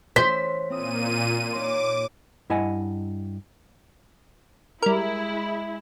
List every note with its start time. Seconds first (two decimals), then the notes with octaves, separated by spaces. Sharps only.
0.16 E3 C#4 C5 B6
0.70 A#2 C4 E4 D#6 D#7
1.53 D#4 C#5 C6 D6
2.50 G2 E4 D#5 F#5 G#5
4.82 G3 G#3 E4 A#4